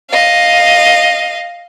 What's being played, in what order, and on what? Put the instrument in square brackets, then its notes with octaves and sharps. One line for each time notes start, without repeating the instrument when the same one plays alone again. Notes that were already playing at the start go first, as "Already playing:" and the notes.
[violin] D#5 F5